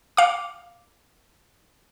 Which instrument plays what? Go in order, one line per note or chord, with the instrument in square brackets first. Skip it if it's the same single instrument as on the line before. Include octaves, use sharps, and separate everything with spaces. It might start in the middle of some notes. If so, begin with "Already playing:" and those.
[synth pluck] F5 D6